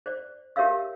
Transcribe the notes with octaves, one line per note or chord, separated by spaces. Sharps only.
C5 D5
G4 A#4 C#5 E5 F5 E6